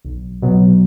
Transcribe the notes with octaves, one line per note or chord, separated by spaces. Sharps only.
B1
B2 F#3 B3